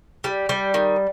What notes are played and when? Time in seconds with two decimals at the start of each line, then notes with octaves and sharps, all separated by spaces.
0.24 G3
0.49 G3
0.74 D#3